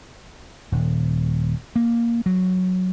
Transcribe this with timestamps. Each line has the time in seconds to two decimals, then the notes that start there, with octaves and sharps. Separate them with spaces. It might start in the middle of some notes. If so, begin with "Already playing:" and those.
0.72 D#1
1.76 A#3
2.26 F#3